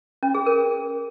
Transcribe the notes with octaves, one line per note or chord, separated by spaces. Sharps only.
C#4
G#4
A#4